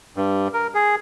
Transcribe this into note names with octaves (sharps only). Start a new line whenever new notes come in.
G2
A#4
G#4